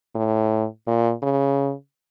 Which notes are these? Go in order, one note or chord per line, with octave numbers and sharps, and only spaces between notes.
A2
A#2
C#3